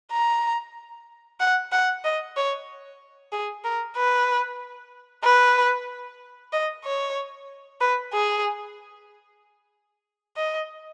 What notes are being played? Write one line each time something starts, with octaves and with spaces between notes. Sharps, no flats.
A#5
F#5
F#5
D#5
C#5
G#4
A#4
B4
B4
D#5
C#5
B4
G#4
D#5